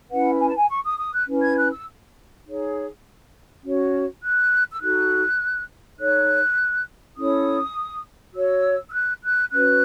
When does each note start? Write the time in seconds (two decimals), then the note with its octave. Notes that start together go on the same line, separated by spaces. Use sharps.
0.09 C#4 E4 B4 F#5
0.39 G#5
0.46 A5
0.55 G#5
0.68 C#6
0.83 D#6
0.97 D#6
1.12 F#6
1.26 C#4 E4 B4
1.41 G#6
1.56 F#6
1.71 E6
2.44 D#4 G#4 C#5
3.62 C#4 F#4 C#5
4.21 F#6
4.70 E6
4.80 D#4 F#4 A4 F#6
5.98 D#4 A4 C#5 F#6
7.15 C#4 E4 A4 C#5 D#6
8.33 F#4 C#5 E6
8.87 E6
8.92 F#6
9.22 F#6
9.51 C#4 F#4 B4 F#6